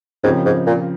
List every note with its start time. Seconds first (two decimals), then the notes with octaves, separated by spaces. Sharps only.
0.24 G#2 C#3 F3 C4 G4 A#4
0.45 G#2
0.66 A#2